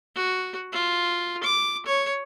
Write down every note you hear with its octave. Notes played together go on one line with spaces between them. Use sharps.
F#4
F4
D6
C#5